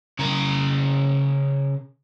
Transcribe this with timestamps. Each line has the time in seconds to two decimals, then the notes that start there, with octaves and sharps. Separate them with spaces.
0.19 C#3 A#4